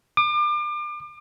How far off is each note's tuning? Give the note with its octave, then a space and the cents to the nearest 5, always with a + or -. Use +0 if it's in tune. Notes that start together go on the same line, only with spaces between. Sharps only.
D6 +35